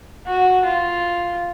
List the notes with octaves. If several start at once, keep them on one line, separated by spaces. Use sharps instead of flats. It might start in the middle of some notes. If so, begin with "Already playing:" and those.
F#4
F4